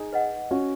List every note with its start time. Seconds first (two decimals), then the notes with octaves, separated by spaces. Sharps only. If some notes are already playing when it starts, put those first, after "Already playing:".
Already playing: D#4 G#4
0.13 B4 D#5 F#5
0.51 C#4 F#4